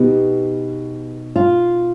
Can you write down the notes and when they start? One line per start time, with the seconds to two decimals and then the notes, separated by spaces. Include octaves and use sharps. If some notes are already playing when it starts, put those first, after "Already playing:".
Already playing: B2 B3 D#4 G4
1.36 F4